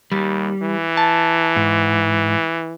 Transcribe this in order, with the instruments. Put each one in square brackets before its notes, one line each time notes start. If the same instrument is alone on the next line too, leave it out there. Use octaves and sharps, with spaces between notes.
[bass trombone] D#2 [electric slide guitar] G3
[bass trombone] E3
[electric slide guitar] A5
G#2